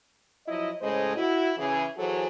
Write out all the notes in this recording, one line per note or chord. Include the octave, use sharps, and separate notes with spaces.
F3 F#3 E4 D#5
A2 C#3 G#3 A4 C5 D#5
E4 F#4
C#3 E3 G#4
E3 F#3 F#4 G#4 A4 C5